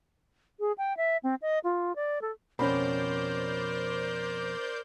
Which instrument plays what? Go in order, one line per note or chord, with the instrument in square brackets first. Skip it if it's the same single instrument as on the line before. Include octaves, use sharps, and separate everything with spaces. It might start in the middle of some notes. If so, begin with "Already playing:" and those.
[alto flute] G#4
G5
E5
C4
D#5
F4
D5
A4
[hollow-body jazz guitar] F2 B2 [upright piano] C#4 B5 [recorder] A#4 [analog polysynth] C5 D5 G6